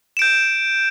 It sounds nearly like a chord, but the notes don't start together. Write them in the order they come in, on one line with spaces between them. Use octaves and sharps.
E7 D7 G6